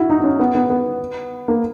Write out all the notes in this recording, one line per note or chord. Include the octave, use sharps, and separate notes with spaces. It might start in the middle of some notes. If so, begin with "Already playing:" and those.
Already playing: E4 F#4
D#4
D#4
C#4
B3
B3
B3
A#3